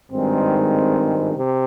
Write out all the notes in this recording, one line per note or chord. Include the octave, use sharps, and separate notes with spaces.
G#1 G2 D#3 G#3 C4
C3